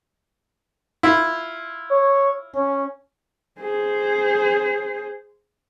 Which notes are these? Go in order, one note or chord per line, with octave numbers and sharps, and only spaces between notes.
E4 F4
C#5
C#4
G#4 C5